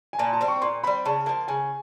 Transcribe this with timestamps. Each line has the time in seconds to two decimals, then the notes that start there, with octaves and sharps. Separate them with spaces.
0.13 G#5
0.19 A#2 A5
0.33 A5
0.41 G3 C4
0.48 C#6
0.61 A#2 C6
0.83 G3 C4 B5
1.06 C#3 A5
1.26 F3 A#3 A5
1.48 C#3 G#5